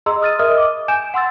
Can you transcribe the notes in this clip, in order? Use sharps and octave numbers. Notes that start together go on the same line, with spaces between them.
G#4 D#5 A#5 C6 E6
D#6 F6 A6 D#7
A#4 D#5 E5 D#6 F6
D6
G#5 G6 D7 E7
F#5 C6 E6 A6